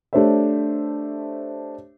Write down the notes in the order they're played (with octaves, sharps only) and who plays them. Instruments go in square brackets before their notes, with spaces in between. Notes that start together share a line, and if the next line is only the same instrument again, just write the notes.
[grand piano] A3 D4 G4 C5 C#5 E5